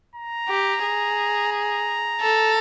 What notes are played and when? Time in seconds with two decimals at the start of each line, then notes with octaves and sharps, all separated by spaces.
0.15 A#5
0.49 G4
0.84 G#4
1.52 A#5
2.21 A4